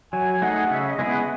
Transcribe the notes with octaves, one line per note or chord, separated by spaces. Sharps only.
F#3 G#5
A3 D#4 G#4 F#5
C#3 E5
D#5
G#3 B3 E4 G#4
F#5